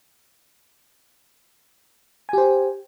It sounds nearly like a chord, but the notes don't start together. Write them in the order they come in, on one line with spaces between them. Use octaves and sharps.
G#5 G4 C5